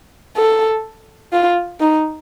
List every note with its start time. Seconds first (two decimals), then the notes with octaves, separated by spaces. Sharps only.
0.37 A4
1.33 F4
1.81 D#4